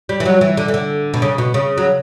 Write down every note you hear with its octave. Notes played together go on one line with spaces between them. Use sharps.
G3
E3
F#3
E3
D3
E3
D3
B2
C#3
B2
C#3
F#3